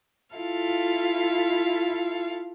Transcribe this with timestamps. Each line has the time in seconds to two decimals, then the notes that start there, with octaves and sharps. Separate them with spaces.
0.35 E4 F4 A4 F5